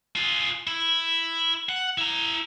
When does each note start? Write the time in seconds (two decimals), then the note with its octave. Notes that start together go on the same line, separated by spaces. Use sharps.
0.16 F4 G#4
0.67 E4
1.69 F#5
1.98 E4 A#5